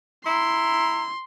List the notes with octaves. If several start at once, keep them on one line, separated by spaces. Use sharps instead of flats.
E4 A#5 C6